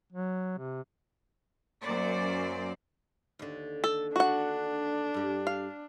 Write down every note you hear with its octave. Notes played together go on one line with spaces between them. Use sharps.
F#3
C3
F#2 A#3 C5 D5
D#2 D3
A4
D4 F#4 F#5
G2 G4
F5